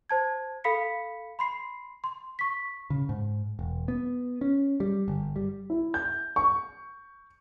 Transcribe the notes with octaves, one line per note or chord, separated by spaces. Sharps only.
C5 A5 G#6
A4 F5 B5 B6 C#7
B5 C6 C7
C6
C#6 B6
C#3
G#2
E1
B3
C#4
G3
G1
G3
E4
G6
C#6